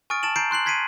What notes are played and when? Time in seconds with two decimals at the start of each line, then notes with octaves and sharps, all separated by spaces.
0.10 G#5 C#6 D#6 F6 A6 D7
0.23 A5 A6 D7 E7 F#7
0.36 A#5 G6 A6 C7 D7
0.51 C6 F#6 C7 F#7
0.66 C6 G#6 B6 C7 D7 D#7